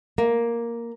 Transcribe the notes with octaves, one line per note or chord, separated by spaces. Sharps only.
A#3